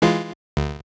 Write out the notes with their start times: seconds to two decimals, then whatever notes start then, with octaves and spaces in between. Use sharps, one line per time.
0.02 E3 G#3 F4
0.57 D2